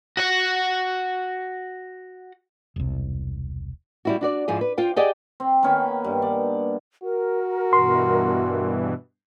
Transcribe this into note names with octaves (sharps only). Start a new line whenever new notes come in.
F#4 F#5
E1 C2
G3 E4 F#4
D4 F#4 D5
G#2 F3 E4 G#4
B4
F4 C5 G5
G4 G#4 D5 D#5 F#5 G5
C4
D#3 A#3 B3 C#4
G2
D5
F#4 A#4
G2 B2 E3 C6